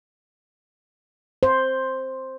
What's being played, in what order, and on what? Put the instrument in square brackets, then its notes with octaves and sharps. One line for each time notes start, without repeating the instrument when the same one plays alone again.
[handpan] C5